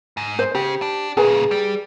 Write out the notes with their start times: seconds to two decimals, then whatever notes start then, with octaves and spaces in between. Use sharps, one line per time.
0.17 G#2
0.39 C5
0.55 C#3 G4
0.82 D4
1.17 A#2 C#3 G#4 B4 G#5
1.51 G3